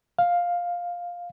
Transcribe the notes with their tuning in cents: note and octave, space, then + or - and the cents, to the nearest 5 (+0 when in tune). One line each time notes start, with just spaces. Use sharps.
F5 +10